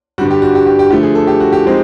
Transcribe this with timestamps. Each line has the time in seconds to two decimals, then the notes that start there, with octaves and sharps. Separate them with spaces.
0.18 G2 D3 G3 F#4
0.31 G4
0.42 F#4
0.55 G4
0.67 G4
0.79 G4
0.91 D3 F3 A3 G4
1.03 G#4
1.15 A4
1.27 G4
1.40 F#4
1.53 G4
1.65 F3 G#3 C4 D#4